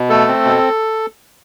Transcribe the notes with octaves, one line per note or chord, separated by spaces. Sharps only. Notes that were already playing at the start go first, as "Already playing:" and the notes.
Already playing: B2
A3 A4
C4
B2